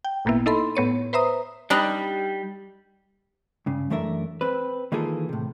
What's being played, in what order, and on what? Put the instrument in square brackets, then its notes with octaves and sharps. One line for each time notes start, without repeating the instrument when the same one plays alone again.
[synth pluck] G5
G#1 A#2 A#3 B3 E4
D#4 E4 A4 D#5 B5 C6
A2 B3 C#5 D#7
B4 C5 E5 A#5 D#6
[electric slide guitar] G3 [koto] D4 D#4 B4
[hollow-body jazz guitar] G2 C#3
F#2 E3 A3 D4 A#4 E5
C4 B4
D#3 E3 A#3 F4 G#4 A4
A2 C3